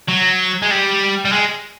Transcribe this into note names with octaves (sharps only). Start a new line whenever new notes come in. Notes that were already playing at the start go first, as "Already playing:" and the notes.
F#3
G#3
G3
G3
G#3